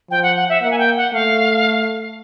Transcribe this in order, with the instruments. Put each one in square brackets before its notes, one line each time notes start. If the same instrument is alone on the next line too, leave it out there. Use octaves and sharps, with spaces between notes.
[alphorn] F3 [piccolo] G5
[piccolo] F#5
F#5
E5
[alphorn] A#3 [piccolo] F#5
[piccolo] G#5
G5
F#5
[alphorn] A3 [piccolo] F5